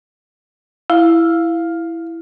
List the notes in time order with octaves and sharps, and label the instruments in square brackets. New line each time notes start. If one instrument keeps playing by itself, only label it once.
[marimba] E4 [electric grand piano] F5